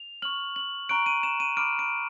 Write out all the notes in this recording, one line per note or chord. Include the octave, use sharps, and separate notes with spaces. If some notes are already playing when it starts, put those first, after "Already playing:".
Already playing: F7
C#6 F6 F#7
F#7
A#5 C#6 F#6 D7
D#7
E7
D#7
B5 D6 F6 D7
D7